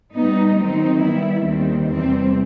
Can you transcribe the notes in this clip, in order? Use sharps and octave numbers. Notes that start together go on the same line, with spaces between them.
A2 G3 B3 D#4
D#3 F#3 C4 D#4
D#3 G3 B3 E4
D#2 D#3 G3 C4
E2 C3 E3 G3 C4